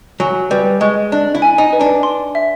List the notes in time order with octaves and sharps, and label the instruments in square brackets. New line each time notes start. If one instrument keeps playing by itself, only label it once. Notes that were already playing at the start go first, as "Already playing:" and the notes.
[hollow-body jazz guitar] F#3 [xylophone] G#5
[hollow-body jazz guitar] G3 [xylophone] B4
[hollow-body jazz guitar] G#3 [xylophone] C#6
[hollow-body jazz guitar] D4 [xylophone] D#5
[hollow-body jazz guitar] E4
[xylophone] G#5
[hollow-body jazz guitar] D#4
[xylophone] B4
[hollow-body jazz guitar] D4
[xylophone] C6
E5